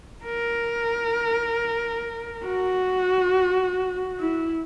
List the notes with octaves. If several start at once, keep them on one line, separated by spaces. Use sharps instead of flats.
A#4
F#4
E4